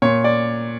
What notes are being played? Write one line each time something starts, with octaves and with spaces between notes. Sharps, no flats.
A#2 C#5
D5